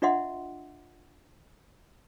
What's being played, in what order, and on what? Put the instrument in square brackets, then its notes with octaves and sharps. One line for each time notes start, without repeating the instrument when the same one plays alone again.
[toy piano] D4 F4 D#5 E5 F#5 C6